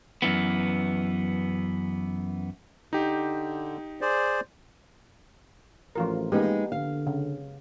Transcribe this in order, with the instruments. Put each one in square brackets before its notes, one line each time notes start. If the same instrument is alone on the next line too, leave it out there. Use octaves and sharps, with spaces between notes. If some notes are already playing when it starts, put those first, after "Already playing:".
[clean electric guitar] F#2 E3 B3
[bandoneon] D3 [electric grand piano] D#4 G4
[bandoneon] G#4 C5 D5
[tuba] A1 [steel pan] F3 F4 A#4
[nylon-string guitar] G#3 B3 D#4 [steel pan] A#3 G4
[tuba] D3 [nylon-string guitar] F5
[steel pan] C#3